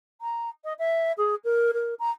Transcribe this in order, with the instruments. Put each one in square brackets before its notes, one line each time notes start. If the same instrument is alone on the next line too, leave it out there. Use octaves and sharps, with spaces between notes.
[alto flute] A#5
D#5
E5
G#4
A#4
A#4
A#5